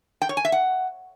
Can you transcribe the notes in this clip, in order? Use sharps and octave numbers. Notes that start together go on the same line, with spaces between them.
G5
C#5
G#5
E5
F#5